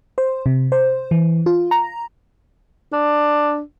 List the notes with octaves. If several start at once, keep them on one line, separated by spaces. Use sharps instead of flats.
C5
C3
C5
E3
F4
A#5
D4